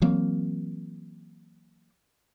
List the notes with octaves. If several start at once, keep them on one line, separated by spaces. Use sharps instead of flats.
E3 F#3 A#3 C4